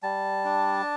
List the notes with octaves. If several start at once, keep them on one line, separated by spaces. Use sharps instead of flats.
G3 A5
D4